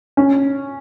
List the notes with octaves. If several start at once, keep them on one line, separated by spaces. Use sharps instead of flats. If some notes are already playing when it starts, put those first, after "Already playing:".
C#4